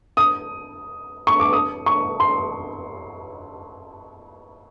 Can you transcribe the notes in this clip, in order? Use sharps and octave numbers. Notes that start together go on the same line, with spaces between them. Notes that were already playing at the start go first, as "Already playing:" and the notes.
D#6
C#6
D6
D#6
C#6
C6